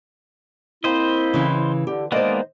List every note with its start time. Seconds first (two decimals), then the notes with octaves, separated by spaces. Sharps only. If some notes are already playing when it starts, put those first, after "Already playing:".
0.84 A#3 C4 E4 C5 D#5
1.34 C#3 E3
1.87 D3 G4
2.12 D#3 G#3 A#3 B3 C5 D5 D#5